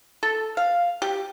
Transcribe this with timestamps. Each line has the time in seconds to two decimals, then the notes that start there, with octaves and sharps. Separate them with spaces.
0.23 A4
0.57 F5
1.02 G4